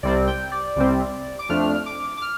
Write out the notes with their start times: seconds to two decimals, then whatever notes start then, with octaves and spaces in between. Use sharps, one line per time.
0.03 C2 C3 G3 C4 D5
0.27 G5
0.52 D5
0.76 C2 C3 G3 C4
1.39 D6
1.49 F2 F3 A3 D4 F6
1.86 D6
2.17 D6
2.22 F6